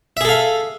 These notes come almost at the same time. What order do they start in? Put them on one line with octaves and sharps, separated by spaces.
E5 G#4 A4 F5